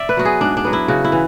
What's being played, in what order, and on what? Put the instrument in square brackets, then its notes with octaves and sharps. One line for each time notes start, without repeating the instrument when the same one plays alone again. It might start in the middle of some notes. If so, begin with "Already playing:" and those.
Already playing: [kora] D5 E5
B4
F#3 B3 F#4
G#4
G#2 D4
D4
F#3 B3
E4
C#3 F#4
E4
E3